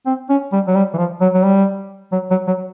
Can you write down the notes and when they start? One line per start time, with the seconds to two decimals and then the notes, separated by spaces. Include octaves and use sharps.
0.06 C4
0.30 C#4
0.53 G3
0.67 F#3
0.76 G3
0.94 E3
0.98 F3
1.21 F#3
1.34 F#3
1.44 G3
2.12 F#3
2.31 F#3
2.47 F#3